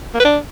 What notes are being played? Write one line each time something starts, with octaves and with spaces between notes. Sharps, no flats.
A#3
B4
D4